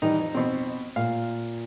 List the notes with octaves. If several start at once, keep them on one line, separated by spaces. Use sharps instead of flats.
D#3 E3 G3 D#4
F2
B2 C4
A#2 A#4 F5